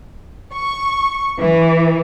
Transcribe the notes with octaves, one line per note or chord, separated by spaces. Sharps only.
C#6
E3